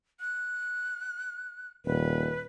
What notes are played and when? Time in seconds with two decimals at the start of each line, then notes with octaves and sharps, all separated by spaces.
0.20 F#6
1.85 D#1 B4